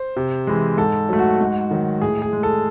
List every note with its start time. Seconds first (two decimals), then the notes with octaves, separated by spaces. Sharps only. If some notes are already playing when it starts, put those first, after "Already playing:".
Already playing: C5
0.16 C3
0.47 E3 G#3
0.77 G#2 A4
1.09 F#3 A3
1.19 F#4
1.40 G#2
1.71 D#3 F#3
2.02 A2 G#4
2.22 G#4
2.33 G#3
2.43 A4